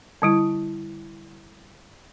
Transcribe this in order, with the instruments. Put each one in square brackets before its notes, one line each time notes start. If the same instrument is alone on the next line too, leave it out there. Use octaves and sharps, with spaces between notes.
[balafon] D3 G3 E4